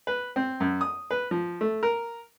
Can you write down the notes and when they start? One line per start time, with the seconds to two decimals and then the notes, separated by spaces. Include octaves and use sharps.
0.07 B4
0.36 C4
0.60 F#2
0.81 D#6
1.11 B4
1.31 F3
1.61 A3
1.83 A#4